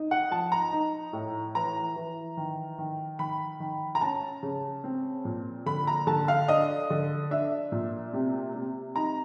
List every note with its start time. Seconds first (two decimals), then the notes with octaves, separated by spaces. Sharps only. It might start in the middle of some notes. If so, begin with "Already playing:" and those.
Already playing: D#4
0.11 F#5
0.31 F3 A5
0.52 A#5
0.72 D#4
1.13 A2
1.55 E3 A#5
1.96 E3
2.37 D#3
2.78 D#3
3.19 D#3 B5
3.60 D#3
3.95 A#5
4.01 C#4 A5
4.43 C#3
4.84 C4
5.25 A#2
5.66 D3 B5
5.87 A#5
6.07 D3 A5
6.28 F5
6.48 D4 D#5
6.90 D3
7.31 D4 E5
7.72 A#2
8.13 C3
8.54 C3
8.95 D#4 A#5